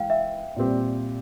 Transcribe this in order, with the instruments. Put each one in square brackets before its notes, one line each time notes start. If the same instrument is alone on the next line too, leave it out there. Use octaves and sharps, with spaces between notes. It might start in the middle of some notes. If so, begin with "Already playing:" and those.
Already playing: [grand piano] E3 G#3 E4 [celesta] F5 G5
[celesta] E5
[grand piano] A#2 G3 C4 G4